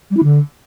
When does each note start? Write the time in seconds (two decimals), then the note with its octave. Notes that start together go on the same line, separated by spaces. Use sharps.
0.11 G3
0.17 E4
0.23 D3